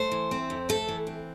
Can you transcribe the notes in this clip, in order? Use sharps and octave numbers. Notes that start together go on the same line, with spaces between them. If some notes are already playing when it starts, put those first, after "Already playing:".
Already playing: A3 C5
E3
C4
F2
A3 A4
E3
C4